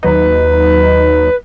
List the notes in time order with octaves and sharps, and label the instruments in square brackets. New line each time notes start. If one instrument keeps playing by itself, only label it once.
[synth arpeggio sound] D#2 F#3 D#4 [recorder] B4